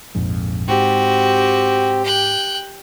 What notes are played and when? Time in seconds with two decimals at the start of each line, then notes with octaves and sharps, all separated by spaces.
0.15 A#1 F2 G#2
0.68 G#2 C4 F#4 G4
2.04 G5 F#6